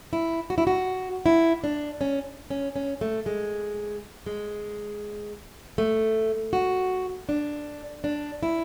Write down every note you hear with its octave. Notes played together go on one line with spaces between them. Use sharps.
E4
F#4
E4
F#4
E4
D4
C#4
C#4
C#4
A3
G#3
G#3
A3
F#4
D4
D4
E4